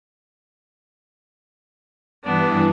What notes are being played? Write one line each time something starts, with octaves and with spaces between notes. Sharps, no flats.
G2 E3 B3 D4